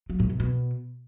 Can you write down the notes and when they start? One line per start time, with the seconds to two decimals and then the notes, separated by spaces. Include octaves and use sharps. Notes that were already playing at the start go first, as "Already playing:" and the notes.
0.10 F#3
0.20 A2
0.30 B2
0.40 B2